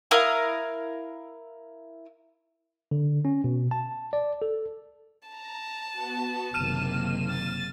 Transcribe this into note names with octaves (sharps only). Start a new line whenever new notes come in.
E4 A#4 F5 D#6
D3
C#4
B2
A5
D5
A4
A5 A#5
B3 F#4
F#1 C3 D#3 A#3 F6 D#7 E7
A6